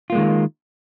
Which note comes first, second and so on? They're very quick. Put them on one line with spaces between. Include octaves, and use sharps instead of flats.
F4 A#3 G#3 D#3